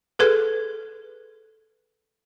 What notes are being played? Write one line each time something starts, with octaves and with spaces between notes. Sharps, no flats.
G#4 A4 B4